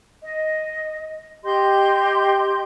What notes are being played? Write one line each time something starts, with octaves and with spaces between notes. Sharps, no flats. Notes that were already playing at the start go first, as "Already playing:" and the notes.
D#5
G4 D#5 C6 G6